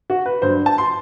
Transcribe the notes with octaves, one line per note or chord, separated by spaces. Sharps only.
F#4
B4
G2 F#3 C5
A5
C6